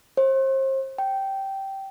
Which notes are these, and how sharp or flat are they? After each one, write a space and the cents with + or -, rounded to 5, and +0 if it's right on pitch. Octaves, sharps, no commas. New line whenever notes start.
C5 +35
G5 -10